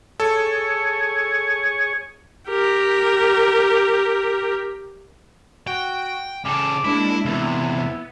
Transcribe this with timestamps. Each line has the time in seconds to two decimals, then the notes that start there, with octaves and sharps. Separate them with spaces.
0.20 G#4 A4 C#5
2.49 G4 A#4
5.67 F#4 G5
6.45 C#3 A4 D6
6.85 G#3 A#3 D4 E4
7.25 E2 C3 B3 E4